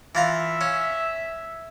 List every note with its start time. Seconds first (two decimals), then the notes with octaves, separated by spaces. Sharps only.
0.15 E3 F4 E5 A#5
0.61 C#4